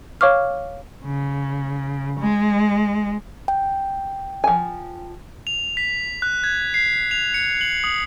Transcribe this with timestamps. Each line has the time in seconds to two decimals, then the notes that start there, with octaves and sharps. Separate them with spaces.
0.21 C#5 F5 C#6 D6 F6
1.05 C#3
2.20 G#3
3.48 G5
4.44 F3 G#5
5.47 F7
5.77 B6
6.22 F#6
6.44 G#6
6.74 C7
7.11 F7
7.34 C#7
7.61 F#7
7.84 D#6